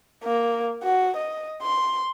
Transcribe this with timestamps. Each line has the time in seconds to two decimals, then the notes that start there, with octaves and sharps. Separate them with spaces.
0.24 A#3
0.83 F#4
1.16 D#5
1.62 C6